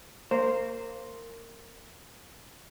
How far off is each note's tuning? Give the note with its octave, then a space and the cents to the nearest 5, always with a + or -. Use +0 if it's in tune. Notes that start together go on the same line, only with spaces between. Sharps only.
A#3 -20 C5 +0